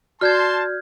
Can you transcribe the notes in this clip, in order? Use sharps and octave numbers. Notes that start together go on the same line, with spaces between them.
F#4 D5 A5 C6 F6 G6 G#6